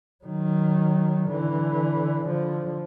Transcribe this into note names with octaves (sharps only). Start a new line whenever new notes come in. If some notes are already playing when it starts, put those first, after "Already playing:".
D#3 F#3
D3 E3
D3 F3